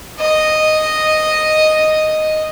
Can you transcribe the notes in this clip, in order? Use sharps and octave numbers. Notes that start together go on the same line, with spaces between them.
D#5